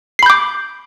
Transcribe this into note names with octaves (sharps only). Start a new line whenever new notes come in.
B5 D6 G6 C7